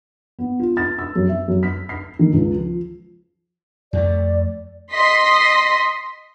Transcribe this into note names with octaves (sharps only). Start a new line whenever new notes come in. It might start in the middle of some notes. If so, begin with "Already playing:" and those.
B3
F4
A6
E6
F#2
E5
F#2
B6
C7
D#3
C#2
F3
F2 A3 D5
D#5 C6 B6